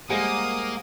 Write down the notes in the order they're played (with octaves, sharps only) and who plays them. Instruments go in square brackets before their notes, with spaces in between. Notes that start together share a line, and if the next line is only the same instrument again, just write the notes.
[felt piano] G3 G#3 [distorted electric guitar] A#3 [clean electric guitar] C5 F#5 G#5 [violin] D#6